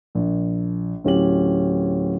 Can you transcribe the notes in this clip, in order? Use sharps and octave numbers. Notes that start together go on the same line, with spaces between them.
A#1
D1 C#4 G4 F#7